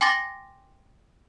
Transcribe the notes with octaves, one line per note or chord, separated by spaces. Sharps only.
G5 G#5 C6 D6 A6 A#6